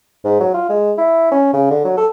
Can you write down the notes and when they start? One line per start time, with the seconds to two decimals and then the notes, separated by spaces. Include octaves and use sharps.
0.24 G#2
0.40 F#3
0.54 F4
0.69 G#3
0.98 E4
1.31 C#4
1.53 C#3
1.71 D3
1.85 F#3
1.97 A4